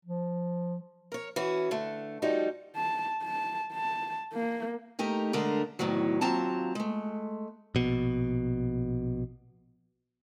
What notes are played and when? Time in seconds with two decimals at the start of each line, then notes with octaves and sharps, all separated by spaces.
0.05 F3
1.12 A#4 C#5
1.36 E3 C#4 F#4
1.71 D3 A3
2.22 F3 G3 D#4 F#4
2.75 A5
3.23 A5
3.73 A5
4.33 A#3
4.99 A3 D#4 G4 A#4
5.33 D3 G#3 A3 A#4
5.79 E2 A2 C3 D#3 F#3
6.21 D#2 F#3 C4 F4 A5 A#5
6.75 G#3 A3
7.75 A#1 B2